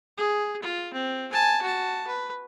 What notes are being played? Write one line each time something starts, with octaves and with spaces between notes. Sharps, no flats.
G#4
F4
C4
G#5 A5
F#4 A5
B4